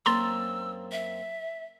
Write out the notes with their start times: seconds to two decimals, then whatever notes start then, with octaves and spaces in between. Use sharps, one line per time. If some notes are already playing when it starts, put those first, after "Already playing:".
0.06 F#2 A#3 C4 A#5 C6 E6 A6
0.92 E5